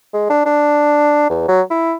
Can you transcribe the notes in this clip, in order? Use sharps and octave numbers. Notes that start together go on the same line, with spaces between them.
G#3
D4
D4
E2
F#3
E4